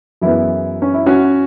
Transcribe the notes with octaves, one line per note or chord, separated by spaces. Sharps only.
F#2 E3 G#3 B3 E4
C#4
E4
C#4 F#4